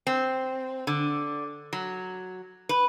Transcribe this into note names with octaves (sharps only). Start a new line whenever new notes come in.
C4
D3
F#3
B4